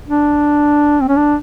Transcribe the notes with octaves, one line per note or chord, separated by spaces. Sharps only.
D4
C4
C#4
D4